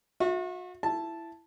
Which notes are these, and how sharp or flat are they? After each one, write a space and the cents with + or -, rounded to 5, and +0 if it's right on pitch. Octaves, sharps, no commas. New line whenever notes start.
F#4 -40 E5 +0
E4 +15 A5 -5